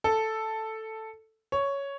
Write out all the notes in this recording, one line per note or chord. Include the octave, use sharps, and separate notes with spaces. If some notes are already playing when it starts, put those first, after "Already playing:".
A4
C#5